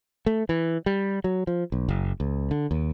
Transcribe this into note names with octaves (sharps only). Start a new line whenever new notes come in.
A3
E3
G3
F#3
F3
B1
F#1
C#2
D3
D#2